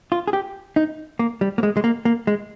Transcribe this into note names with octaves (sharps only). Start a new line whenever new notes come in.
F4
G#4
G4
D#4
A#3
G3
A#3
G#3
G#3
A#3
A#3
G#3